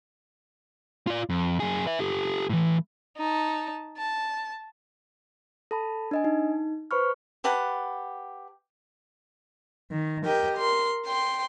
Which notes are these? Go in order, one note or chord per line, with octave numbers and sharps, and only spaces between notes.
F4 D5
F2
F#2 G#4
B4 E5
G4 A4
A2 E3
D#4 A5
A5
A4 A5 B5
D4 D#5 G#5
D#4
B4 C5 B5 C#6 F6
G4 B4 F#5 A5
D#3
G4 A#4 D#5 G5
A#4 C6
G5 C6